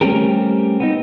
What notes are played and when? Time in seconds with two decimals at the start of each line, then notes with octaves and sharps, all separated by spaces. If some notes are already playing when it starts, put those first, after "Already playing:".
0.01 G3 A3 C4 C#4 G4 A#4
0.80 B3 C4 D#4